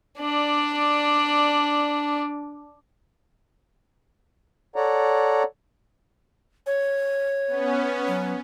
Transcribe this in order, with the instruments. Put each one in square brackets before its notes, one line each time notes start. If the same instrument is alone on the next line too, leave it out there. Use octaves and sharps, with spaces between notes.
[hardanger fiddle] D4 D5
[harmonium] A4 C#5 D5 F#5 A#5
[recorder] C#5
[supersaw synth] B3 C#4
[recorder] F#3